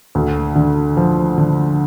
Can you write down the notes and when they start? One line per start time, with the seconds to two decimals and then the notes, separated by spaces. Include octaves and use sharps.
0.15 D2
0.56 D3
0.97 F3
1.38 D3